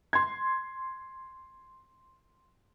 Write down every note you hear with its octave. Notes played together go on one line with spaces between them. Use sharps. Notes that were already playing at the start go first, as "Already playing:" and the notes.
C6 G#6